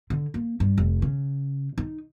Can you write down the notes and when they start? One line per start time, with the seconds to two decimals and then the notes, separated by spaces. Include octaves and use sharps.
0.10 D3
0.34 A#3
0.60 G2
0.78 F1
1.02 C#3
1.78 D#4